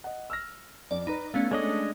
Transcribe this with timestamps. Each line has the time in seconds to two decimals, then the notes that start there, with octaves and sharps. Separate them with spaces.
0.04 D#5 F#5
0.30 E6 F6 A#6
0.91 F2 D5
1.07 D#4 B4 A#5 B5
1.34 A3 B3 C#4 F5
1.51 G#3 D4 A4 C#5 D#5 D#6